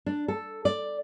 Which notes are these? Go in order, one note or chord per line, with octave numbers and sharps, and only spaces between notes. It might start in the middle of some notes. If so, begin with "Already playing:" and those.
D4
A4
D5